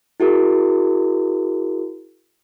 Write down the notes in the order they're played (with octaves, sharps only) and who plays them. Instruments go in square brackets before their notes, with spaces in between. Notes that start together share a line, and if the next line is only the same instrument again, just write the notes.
[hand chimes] E4 F#4 G#4 A#4